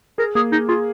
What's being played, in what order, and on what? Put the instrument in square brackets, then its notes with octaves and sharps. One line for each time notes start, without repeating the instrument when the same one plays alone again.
[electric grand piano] G#4 [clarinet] A#4
[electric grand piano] A#3 [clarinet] G#4
[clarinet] D#4 [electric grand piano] G#4
[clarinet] F4 [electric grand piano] G#4